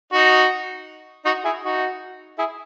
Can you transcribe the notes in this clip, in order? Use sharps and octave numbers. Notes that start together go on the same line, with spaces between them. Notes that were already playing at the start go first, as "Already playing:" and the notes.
D#4 F#4
D#4 F#4
E4 G#4
D#4 F#4
E4 G#4